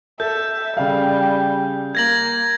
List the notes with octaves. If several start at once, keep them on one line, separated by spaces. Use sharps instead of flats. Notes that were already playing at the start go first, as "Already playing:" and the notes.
A4 E5 G6
C#3 G3 F5
A#3 G#6 A#6 F#7